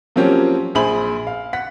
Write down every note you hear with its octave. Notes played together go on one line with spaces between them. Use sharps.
F3 F#3 A#3 C4 C#4 G4
A#1 G#4 C5 B5 F#7
F5
F#5 B6